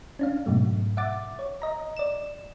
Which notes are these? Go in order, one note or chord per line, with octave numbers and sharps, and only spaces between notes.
C#4 D4 F5
G#2 B2 F#3 A3
E5 F#5 D6 A6
C#5
D#5 A#5
D5 E7